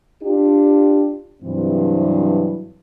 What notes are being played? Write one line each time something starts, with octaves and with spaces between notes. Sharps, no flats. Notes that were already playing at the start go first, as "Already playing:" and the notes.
D4 F4 G4
G2 C3 E3 F#3 C4